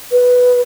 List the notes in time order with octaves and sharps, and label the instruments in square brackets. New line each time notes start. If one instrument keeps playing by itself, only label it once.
[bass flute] B4